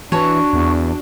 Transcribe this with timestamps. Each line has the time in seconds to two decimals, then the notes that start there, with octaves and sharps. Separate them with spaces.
0.12 E3 D4 F#4 C#5 A5
0.53 E2